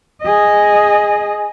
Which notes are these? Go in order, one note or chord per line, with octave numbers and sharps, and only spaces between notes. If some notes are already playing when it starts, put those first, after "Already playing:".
G#4 D#5